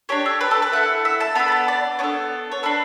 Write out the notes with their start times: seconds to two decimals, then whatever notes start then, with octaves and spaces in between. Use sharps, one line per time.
0.09 D4 G4 C#5
0.26 A4
0.41 B4
0.51 A4
0.62 B4
0.72 A3 E4 A4 F#5
1.05 E5
1.20 A5
1.35 B3 D4 A4 B5
1.48 B5
1.52 A5
1.68 D5
1.99 B3 D4 A4 C#5
2.52 C#5
2.63 D4 A4 B4